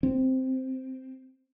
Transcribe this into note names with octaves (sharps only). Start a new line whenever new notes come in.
C4